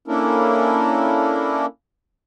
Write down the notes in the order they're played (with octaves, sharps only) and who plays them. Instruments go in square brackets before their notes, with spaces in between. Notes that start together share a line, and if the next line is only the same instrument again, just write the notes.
[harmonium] A#3 C#4 D4 E4 A4 A#4